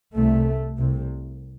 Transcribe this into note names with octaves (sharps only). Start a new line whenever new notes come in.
C2 C3 A3
C2 C3